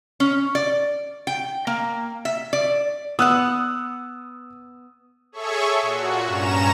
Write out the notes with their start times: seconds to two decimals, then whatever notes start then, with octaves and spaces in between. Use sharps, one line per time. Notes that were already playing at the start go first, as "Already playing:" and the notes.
0.20 C#4
0.55 D5
1.27 G5
1.67 A#3
2.25 E5
2.53 D5
3.19 B3 F#5 D#6 E6 F#6
5.32 G#4 A4 C#5 E5 C#6
5.82 A#2 F#4
6.25 G2 C#4 A#5 E7